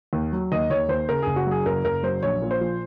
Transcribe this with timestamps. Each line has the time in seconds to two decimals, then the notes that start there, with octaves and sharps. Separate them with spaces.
0.13 D#2
0.33 F#3
0.52 D#2 D#5
0.70 D#2 C#5
0.89 D#2 C5
1.09 C#3 A#4
1.22 F#1 G#4
1.36 F#4
1.47 F#3 G#4
1.66 F#1 A#4
1.84 F#1 A#4
2.03 F#3 C5
2.23 A#1 C#5
2.42 A#2
2.51 C5
2.61 F3